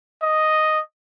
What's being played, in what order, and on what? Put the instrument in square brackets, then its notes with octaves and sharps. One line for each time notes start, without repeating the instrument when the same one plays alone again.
[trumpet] D#5